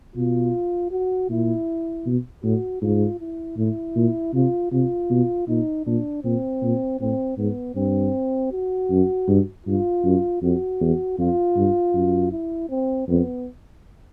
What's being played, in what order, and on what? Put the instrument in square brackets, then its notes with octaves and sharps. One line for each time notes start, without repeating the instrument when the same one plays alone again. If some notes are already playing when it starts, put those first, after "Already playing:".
[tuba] B2 [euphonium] F4
[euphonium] F#4
[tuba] A#2 [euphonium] E4
[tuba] B2
[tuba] A2 [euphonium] F#4
[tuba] G#2 [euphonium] F4
[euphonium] E4
[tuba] A2 [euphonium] E4
[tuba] A#2
[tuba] C3 [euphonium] F4
[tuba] C3 [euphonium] F4
[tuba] B2
[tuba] A#2 [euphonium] D#4
[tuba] A#2 [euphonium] D4
[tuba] A#2 [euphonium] C4
[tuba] A#2
[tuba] A2 [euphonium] C4
[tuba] G#2 [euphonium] B3
[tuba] G2 [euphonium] C4
[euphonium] F#4
[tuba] F#2
G2
[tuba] G2 [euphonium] F4
[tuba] F#2
[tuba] F2 [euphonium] F#4
[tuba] E2
[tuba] F2 [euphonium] F4
[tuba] G2
F#2
[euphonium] E4
C4
[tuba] F2 [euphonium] B3